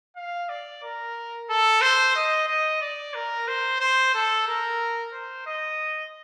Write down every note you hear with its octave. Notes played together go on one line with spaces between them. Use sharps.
F5
D5
A#4
A4
C5
D#5
D#5
D5
A#4
C5
C5
A4
A#4
C5
D#5